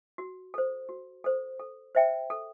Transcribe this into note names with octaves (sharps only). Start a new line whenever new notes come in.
F#4
A4 C5
F#4
A4 C5
A4
C5 E5 G5
A4